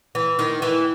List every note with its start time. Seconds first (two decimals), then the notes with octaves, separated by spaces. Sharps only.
0.15 E3
0.39 D#3
0.62 E3